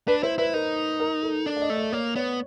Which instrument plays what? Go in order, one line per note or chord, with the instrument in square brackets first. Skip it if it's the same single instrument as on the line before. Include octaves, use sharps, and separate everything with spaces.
[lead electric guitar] D4 [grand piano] B4
[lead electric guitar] E4 [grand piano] C5
[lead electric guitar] E4 [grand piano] B4
[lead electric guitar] D#4 [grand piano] A#4
[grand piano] A#4
A4
[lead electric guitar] D4
[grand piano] D5
D#5
[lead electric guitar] A3
[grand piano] D5
[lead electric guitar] A#3 [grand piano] C#5
[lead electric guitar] B3 [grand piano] C#5